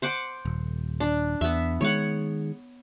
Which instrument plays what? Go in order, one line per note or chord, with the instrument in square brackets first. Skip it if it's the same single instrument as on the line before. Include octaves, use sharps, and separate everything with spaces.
[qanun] C5 F#5 D6
[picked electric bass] D#1
[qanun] D4
[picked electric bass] E2 [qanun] B3 E5
[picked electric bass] D#3 G#3 [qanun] C#5 F#5